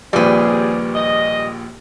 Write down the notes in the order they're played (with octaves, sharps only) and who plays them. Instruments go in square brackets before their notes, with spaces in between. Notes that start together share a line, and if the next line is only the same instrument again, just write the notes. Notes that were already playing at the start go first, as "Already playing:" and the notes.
[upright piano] A#1 D#2 A#2 [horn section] C#3 C4 G#4 [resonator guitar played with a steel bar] G3 B4
[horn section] D#5